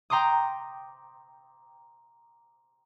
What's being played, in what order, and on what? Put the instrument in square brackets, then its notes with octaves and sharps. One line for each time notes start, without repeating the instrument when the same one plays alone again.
[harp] G5 A#5 C6 D6 D#6